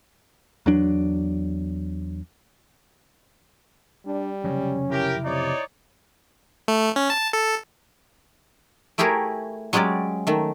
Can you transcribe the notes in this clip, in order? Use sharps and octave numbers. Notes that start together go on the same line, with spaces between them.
E2 F#3 D4
G3 D4
F1 C#3 F#3 C#4
E4 G4 A#4
C3 D#4 C#5 D5
A3
C#4
A5
A4
A3 E4 G4 G#4 A#4 C#5
F#3 G#3 C#4 G4 D5
D#3 A3